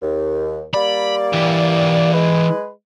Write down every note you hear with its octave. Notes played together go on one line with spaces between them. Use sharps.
D#2
G3 A#3 D5 B5
E3 G4
G#3 B4